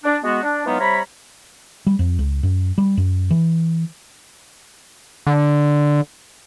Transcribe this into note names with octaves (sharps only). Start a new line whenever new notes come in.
D4
G#3 B3 F#4
D4
E3 F#3 G#3 B3 D#4 F4
C3 G3 C#5 A#5 B5
G3
F2
C#2
F#2
G3
F#2
E3
D3